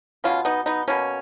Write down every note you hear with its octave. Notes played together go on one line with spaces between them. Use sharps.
B2 G#3 B3 C#4 F4
B3 D#4
B3 D#4
B2 A#3 C#4